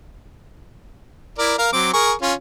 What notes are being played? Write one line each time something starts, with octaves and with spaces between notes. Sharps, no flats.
E4 A#4 D5
A#4 F5
F#3 C4 D6
G#4 A#4 C#6
C#4 F4